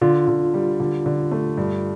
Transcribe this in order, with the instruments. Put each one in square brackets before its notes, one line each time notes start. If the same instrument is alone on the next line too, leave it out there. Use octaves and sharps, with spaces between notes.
[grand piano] D3 [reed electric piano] F4
[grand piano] D3
G3
D3
D3
A3
G2